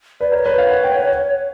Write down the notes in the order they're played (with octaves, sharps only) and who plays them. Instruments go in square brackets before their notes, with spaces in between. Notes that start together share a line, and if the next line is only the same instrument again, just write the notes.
[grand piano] B4 [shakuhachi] D5
[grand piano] A#4 [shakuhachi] C#5
[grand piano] B4
F5
F#5
G5
F#5